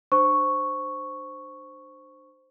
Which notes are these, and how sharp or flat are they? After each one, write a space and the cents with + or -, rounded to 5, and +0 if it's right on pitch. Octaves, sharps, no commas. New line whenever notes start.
D4 +30 C5 +0 C#6 +0